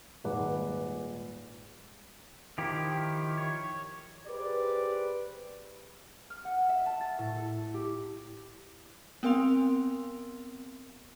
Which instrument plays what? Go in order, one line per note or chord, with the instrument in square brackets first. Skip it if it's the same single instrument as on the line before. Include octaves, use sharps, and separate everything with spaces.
[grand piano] D#1 G#1 G#3 B4 F#5 D6
[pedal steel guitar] D#3 F3 E4 G4
C#5
[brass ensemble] G4 G#4 B4 C5 D5
[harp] F6
F#5
E5
A5
A6
A2
A4
G4
[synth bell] B3 C4 A#4 F5 C6 F7